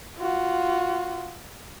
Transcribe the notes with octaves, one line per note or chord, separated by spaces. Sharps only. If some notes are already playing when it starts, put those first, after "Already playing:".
F4 F#4